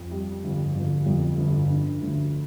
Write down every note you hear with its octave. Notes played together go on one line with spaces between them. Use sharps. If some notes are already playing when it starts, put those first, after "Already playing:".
Already playing: F2
G3
G1
G1
F2
G1
D3
D2